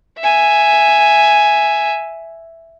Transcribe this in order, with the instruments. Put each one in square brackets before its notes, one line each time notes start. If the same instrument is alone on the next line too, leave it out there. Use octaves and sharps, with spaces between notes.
[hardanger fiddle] E5 G#5